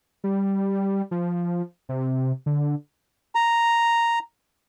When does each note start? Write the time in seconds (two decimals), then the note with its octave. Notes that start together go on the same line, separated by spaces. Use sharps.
0.24 G3
1.11 F3
1.89 C3
2.46 D3
3.35 A#5